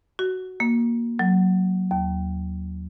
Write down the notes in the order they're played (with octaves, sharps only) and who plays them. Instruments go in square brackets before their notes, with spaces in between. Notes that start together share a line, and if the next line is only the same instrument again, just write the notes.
[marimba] F#4
A#3
F#3
D#2